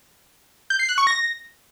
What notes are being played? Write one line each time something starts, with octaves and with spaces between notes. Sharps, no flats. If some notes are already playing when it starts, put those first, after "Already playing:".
G6
C7
F#6
C#6
A#6